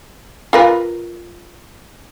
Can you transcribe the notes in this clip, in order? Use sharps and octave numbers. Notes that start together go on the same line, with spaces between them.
F4 A#4 B4